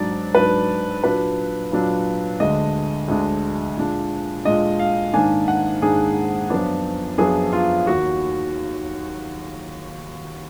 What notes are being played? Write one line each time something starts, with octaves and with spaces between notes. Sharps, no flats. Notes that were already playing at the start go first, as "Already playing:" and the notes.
Already playing: G#2 F#3 D4 D5
G#2 F#3 D4 B4
A#2 F#3 D4 B4
A#2 F#3 D4
D2 D3 G#3 D4 D#5
D2 D3 G#3 D4
A#2 G#3 D4
A#2 G#3 D4 D#5
F5
G#2 D#3 A#3 D4 G#5
F#5
G#2 D#3 A#3 D4 G#4
F#2 F3 B3 D4
F#2 F3 B3 D4 G#4
F4
D#2 D#3 A#3 F#4